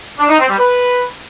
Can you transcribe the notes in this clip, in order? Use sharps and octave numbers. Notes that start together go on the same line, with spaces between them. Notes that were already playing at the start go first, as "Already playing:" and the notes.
D4
D#4
C4
G3
B4